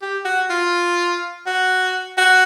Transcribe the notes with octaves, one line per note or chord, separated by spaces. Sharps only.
G4
F#4
F4
F#4
F#4